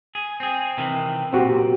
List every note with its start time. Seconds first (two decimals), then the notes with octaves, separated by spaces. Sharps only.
0.15 G#4
0.40 C4 G#4
0.78 C3 D#3 E3
1.33 B1 A#2 C4 F#4 G4